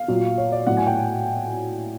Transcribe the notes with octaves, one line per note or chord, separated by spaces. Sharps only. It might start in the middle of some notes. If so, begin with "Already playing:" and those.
Already playing: F5
A#2 F#3
C#5
D5
A2 F#3 F#5
G#5
G5